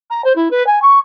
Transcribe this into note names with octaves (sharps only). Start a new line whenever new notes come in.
A#5
C5
E4
B4
G#5
C#6